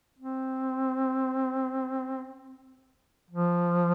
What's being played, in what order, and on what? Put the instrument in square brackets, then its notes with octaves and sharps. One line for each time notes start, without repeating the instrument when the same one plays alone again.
[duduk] C4
F3